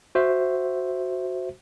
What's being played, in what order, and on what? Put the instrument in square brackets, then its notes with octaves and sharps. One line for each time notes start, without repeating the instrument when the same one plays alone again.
[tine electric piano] F#4 C5 E5